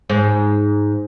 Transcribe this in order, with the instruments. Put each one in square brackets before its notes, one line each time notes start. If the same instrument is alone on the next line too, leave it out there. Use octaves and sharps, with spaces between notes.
[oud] G#2